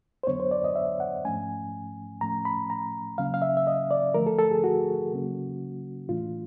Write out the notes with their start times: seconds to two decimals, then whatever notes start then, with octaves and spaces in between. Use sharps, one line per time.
0.23 C5
0.27 F2 D3 F#3 B3 D4 C#5
0.40 C5
0.51 D5
0.64 D#5
0.75 E5
1.00 F#5
1.25 G#2 F3 A3 C#4 G#5
2.21 A2 F3 A3 C#4 A#5
2.45 B5
2.70 A#5
3.18 C#3 F#3 A#3 C#4 F5
3.34 F5
3.42 E5
3.57 E5
3.67 D#5
3.91 D5
4.14 D3 F3 A3 A#4
4.27 A4
4.39 A4
4.51 G#4
4.64 F#4
5.11 C#3 F#3 A#3 C#4
6.09 A2 E3 A3 D4 F4